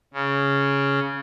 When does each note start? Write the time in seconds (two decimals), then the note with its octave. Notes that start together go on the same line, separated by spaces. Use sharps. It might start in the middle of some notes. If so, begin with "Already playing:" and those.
0.14 C#3